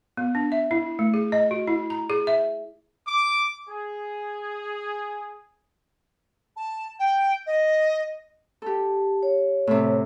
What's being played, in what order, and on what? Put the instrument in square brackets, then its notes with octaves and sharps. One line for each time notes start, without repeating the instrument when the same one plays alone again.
[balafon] B3
D4
E5
E4
A3
G#4
D#5
F#4
E4
A#5
G#4
E5
[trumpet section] D6
G#4
[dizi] A5
G5
D#5
[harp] G4 A4 [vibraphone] A5
[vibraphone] C#5
[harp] A2 C3